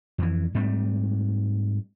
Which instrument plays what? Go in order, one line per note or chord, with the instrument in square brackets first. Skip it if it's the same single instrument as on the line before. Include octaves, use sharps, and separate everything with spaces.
[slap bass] F2 E3
G#2 G3 A3 C4